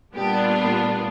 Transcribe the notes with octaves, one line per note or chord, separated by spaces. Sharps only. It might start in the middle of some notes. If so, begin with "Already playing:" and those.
A#2 G3 B3 D4 G4
F4